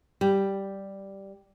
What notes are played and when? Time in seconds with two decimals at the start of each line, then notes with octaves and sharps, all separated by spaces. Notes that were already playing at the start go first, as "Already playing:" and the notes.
0.21 G3